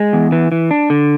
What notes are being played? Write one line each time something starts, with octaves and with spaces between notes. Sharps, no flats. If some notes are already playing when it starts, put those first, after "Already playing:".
Already playing: G#3
E2
E3
E3
D4
D3